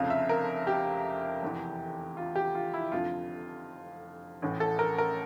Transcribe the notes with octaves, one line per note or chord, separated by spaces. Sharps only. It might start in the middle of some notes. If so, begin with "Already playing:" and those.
Already playing: F1 F2 C#3 F5
E5
A#4
G4
F1 E2 E3
F4
G4
F4
E4
F1 F2 D3 F3 F4
A1 A2 E3
A4
A#4
A#4